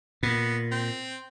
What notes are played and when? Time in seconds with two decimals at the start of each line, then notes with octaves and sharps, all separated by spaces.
0.23 A#2 B3
0.71 C4